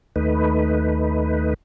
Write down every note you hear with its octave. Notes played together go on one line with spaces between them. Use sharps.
D#2 A3 D#4 B4